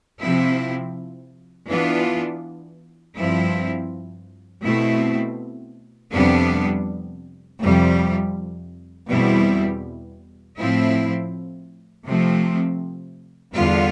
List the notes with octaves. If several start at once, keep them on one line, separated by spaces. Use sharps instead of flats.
C3 F3 C4 E4
E3 B3 D4 F4
G2 F3 C4 E4
B2 A3 C4 E4
F2 C3 G3 B3 D4
F2 C3 G3
E2 B2 G3 C4 E4
A2 F3 C4 E4
C3 F3 A3 C4
E2 D3 G3 B3 F4